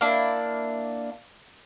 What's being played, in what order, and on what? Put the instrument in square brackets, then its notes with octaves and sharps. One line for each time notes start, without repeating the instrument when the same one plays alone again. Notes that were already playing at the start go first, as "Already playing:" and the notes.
[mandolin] A#3 D4 E4